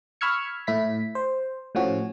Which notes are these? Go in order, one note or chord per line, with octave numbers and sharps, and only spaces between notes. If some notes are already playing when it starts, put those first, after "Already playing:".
B5 C#6 E6 F6 G#6 C#7
A2 E4 B6
C5
A2 F3 C#4 F#4